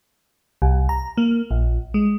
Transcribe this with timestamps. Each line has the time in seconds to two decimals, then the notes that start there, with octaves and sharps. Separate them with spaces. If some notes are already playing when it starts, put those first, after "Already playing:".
0.62 C2
0.89 A#5
1.17 A#3
1.51 A#1
1.94 G#3